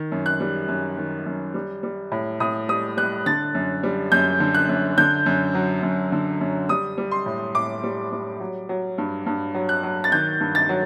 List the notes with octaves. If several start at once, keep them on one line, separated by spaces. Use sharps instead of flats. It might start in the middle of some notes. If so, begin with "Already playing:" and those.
Already playing: D#3
F#2
F#6
G3
F#2
D#3
F#2
G3
G3
A2
A2 D#6
G3 D#6
G3 F#6
D3 A6
F#2
G3
F#2 G6
D3
F#6
F#2
D3 G6
F#2
F#3
F#2
D3
F#2
G3 D#6
G3
C6
A2
A2 D6
G3
G3
F#3
F#3
G2
G2
F#3
F#6
F#3
A6
D#3 G6
G2
A6
F#3